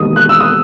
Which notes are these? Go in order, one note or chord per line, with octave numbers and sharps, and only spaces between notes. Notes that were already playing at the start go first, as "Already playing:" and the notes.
Already playing: E1 D#2 D#3 D#6
F#6
E6
D#6